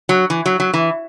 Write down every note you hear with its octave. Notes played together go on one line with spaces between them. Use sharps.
F#3
E3
F#3
F#3
E3